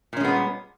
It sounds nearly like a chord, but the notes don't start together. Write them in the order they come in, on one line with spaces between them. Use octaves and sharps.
A#2 C#4 G#3 B3 G3